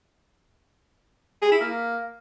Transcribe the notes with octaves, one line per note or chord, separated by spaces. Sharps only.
G#4
E4
A#3